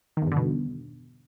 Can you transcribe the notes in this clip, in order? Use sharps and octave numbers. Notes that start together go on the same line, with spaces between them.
E2 G2 B2 D3 D#3